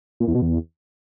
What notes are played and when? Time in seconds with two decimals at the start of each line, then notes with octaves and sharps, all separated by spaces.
0.20 A#2
0.28 E2
0.35 B2
0.42 E2